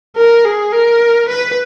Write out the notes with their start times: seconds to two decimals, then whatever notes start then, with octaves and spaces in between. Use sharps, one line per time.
0.16 A#4
0.45 G#4
0.72 A#4
1.28 B4